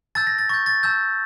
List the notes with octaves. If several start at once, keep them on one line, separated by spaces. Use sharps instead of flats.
A5 E6 G6 A6
A#6
A6
C#6 G6 A6
A6
A5 E6 G6